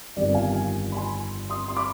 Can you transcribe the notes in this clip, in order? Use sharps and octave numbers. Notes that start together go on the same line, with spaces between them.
G1 F2 D#3 G3 B3 D5
F5 G#5
F5 G#5
B5
G#5 C6
C6 D#6
C6
B5 D6